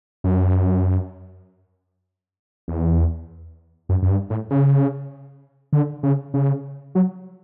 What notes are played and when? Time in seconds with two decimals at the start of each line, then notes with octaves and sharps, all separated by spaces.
0.24 F#2
2.68 E2
3.89 F#2
4.02 F#2
4.10 G2
4.30 A2
4.50 C#3
5.73 D3
6.03 C#3
6.34 C#3
6.95 F#3